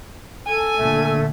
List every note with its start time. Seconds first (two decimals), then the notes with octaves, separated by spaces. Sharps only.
0.47 A4 G#5
0.79 A#2 D3 A3